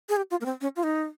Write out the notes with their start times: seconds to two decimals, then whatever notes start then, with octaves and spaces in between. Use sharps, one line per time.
0.09 G#4
0.16 G4
0.31 F4
0.41 A#3
0.45 C4
0.61 C#4
0.76 F4
0.83 D#4